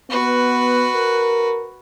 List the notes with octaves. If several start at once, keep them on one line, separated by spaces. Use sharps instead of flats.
B3 F#4 B4
A#4